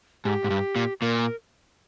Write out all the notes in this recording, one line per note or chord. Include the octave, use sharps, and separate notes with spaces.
G#2 G4
G#2
G2
A#2
A#2 A#4